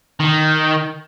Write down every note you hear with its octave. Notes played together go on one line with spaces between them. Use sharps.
D#3